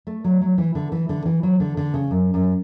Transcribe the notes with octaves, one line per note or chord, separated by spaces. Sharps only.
A3
F#3
F#3
E3
D3
E3
D3
E3
F#3
D3
D3
C#3
F#2
F#2